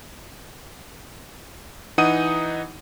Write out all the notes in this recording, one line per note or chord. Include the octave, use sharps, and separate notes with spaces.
E3 D#4 F#5 D#6 D#7